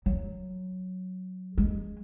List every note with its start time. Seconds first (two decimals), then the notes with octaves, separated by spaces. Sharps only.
0.06 F#3
1.58 G#3